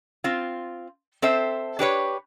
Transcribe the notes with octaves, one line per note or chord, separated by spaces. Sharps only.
C4 F4
C4 A4 C5 E5
D4 G4 B4 C#5